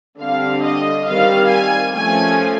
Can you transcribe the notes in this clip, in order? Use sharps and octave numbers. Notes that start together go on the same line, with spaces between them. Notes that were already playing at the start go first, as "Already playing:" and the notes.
D3 G3 C4 F5
D#5
D#3 G3 C4 F5
G#5
F3 A3 C#4 G#5